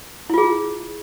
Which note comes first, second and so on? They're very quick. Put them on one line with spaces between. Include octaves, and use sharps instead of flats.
E4 F4 G#4